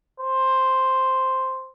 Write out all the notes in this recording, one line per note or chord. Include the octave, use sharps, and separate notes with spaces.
C5